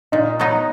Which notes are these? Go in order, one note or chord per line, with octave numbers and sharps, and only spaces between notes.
A#2 D#4
F#3 B3 D#4